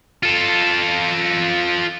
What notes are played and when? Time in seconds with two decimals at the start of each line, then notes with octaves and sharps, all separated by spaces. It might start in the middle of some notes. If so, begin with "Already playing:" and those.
0.23 F4 A4